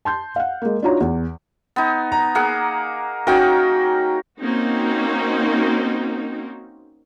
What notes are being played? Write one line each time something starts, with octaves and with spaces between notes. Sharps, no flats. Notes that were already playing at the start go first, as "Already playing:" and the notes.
A5 C6 G6
F5 F#5
G#3 A#3
D4 D#4 F4 F#4 C#5 A#5
E2
B3 D#4
A#5
A#3 G#4 F#5
C#4 D#4 F#4 A#4 G5
A#3 C4 C#4 D#4 F#4